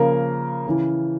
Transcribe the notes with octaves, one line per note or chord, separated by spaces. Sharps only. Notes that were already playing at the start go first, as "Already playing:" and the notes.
Already playing: C#3 F3 A#3 A#4
C#3 E3